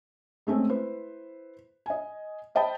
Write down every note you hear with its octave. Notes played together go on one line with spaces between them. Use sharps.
G#3 A3 C4 C#4
E4 B4 C5
D#5 G#5
C5 D#5 G5 A5 B5